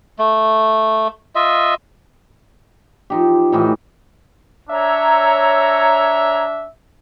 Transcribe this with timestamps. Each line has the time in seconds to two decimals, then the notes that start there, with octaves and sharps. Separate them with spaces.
0.19 A3
1.35 F4 D#5 E5
3.10 F3 D#4 G4
3.52 A2 E3 D#4
4.70 D4 C#5 E5 A#5 E6